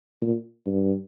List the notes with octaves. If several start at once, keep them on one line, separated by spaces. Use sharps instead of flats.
A#2
G2